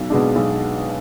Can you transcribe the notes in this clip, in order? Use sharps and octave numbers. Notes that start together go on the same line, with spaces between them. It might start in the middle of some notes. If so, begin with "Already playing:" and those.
Already playing: B1
B2 G#3 D4
B1